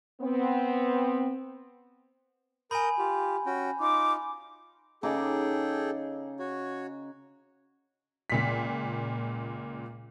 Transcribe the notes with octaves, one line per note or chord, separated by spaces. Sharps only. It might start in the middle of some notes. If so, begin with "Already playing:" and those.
B3 C4
A#4 G#5 B5 D#6 G6
F4 G4
C#4 F#4 G5
D#4 F4 D6
C#3 D#4 G#4 A4 G5 D6
F#4 C#5
C#2 A#2 B6